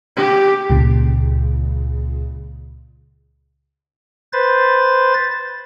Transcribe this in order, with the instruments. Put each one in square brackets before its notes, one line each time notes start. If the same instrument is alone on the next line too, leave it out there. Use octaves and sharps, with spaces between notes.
[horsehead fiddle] G4
[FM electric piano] C#2 A#2 C#3
[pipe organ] B4 C5 A6